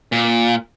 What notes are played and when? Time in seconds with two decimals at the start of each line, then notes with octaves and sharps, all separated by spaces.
0.12 A#2